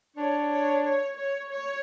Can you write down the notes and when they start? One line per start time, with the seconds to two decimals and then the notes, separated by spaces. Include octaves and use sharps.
0.16 D4 C#5
0.50 C#5
0.83 C#5
1.16 C#5
1.50 C#5